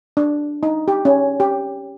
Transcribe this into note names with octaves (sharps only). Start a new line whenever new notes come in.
D4
D#4
G4
C#4
G4